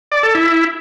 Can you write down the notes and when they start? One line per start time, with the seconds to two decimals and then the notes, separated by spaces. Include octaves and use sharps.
0.12 D5
0.23 A4
0.35 E4